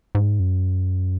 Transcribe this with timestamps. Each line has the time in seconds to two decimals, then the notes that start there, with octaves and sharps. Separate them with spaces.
0.15 G#2
0.40 F#2